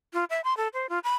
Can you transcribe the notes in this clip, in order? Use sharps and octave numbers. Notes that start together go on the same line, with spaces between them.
F4
E5
C6
A4
C5
F4
B5